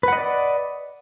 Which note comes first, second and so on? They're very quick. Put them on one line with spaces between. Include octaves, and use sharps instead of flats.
B4 F#5 D#5 D5